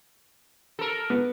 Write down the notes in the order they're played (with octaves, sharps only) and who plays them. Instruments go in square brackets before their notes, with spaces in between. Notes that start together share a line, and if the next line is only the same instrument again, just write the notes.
[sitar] A4 A#4
[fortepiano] B3